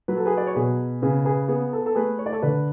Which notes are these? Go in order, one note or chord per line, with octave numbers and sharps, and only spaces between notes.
F#3 B4
A4
G#4 B4
D5
C#5
B2 G#4 B4
C#3 G#4 B4
G#4 B4
B3 G#4
A4
A4
A3 G#4 B4
C#5
D5
A4 C#5
D3 B4 D5